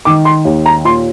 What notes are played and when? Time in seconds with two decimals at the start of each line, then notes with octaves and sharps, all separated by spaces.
0.05 D#3 D6
0.25 C6
0.45 D#2
0.66 A#5
0.85 A#2 C6